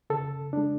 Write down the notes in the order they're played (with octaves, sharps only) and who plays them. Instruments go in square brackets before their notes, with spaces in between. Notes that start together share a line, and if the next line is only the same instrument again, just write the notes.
[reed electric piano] C#3 A4
G#3 D4